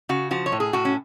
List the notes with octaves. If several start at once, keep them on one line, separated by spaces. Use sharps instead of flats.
C#3 F#4
F3 F#4
C#5
A2
G#4
A2 F#4
C#4